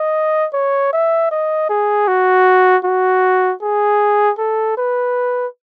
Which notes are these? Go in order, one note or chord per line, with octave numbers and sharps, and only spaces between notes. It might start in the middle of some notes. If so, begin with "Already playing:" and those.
Already playing: D#5
C#5
E5
D#5
G#4
F#4
F#4
G#4
A4
B4